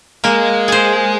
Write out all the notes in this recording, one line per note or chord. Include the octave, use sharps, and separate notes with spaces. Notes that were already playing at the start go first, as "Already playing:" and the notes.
G#3 A#3
G#4 C5